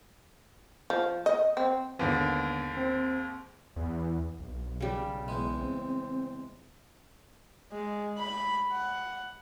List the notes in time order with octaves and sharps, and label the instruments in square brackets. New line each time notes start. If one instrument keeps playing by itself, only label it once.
[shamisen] F3
D#5
C4
[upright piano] D#2 G#2 [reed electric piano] D3 B3
[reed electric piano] C4
[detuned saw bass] E2
B1
[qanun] C#3 G3
[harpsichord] E2 G#3
[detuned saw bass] C4
[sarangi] G#3
B5
F#5